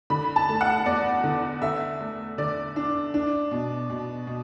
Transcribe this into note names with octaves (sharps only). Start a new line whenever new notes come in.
D3 B5
A5
A3
F#5
E2 D5
D3
D3 E5
A3
D3 D5
D4
D4
B2
B2
B2